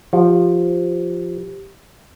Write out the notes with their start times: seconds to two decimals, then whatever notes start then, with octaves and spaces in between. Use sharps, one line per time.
0.13 F3 G4